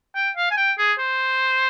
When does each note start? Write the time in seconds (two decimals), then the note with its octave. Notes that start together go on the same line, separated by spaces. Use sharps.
0.15 G5
0.37 F5
0.51 G#5
0.57 G5
0.78 G#4
0.99 C5